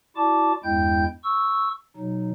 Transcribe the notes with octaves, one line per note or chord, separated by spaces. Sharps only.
E4 F#4 D5 A5 D6
E2 G2 G#3 E4 G5 G6
C#6 E6
B2 F#3 D#4